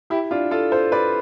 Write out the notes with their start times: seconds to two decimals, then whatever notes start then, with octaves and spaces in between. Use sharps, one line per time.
0.10 E4 G4
0.31 D4 F4
0.51 F4 A4
0.72 A4 C5
0.92 B4 D5